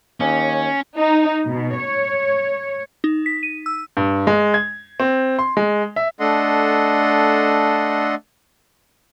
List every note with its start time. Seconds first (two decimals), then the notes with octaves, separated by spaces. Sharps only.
0.20 D#2 C#4
0.97 D#4
1.48 B2
1.80 C#5
3.04 D#4
3.26 B6
3.43 D#7
3.66 E6
3.97 G2
4.27 G#3
4.54 G#6
5.00 C4
5.39 C6
5.57 G#3
5.96 E5
6.20 A3 D4 A4 D#5 F#5 C6